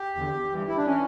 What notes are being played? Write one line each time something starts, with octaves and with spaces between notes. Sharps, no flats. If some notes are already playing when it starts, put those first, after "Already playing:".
Already playing: G4
E2 D3
G2 E3
E4
D4
E3 C#4